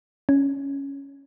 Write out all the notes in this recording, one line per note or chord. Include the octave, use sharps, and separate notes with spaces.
C#4